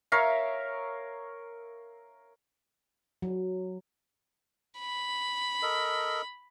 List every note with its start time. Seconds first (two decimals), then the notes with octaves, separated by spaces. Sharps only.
0.12 A#4 C#5 E5 F5
3.22 F#3
4.80 B5
5.63 A4 A#4 D#5